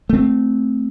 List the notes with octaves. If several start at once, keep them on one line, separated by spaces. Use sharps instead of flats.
A3 C4